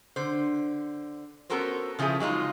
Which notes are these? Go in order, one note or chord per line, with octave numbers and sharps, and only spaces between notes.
D3 C5
B3 C#4 F#4 A4 A#4 C5
C#3 F3 C#4 E4 G#4
F#3 G#3 D#4 F4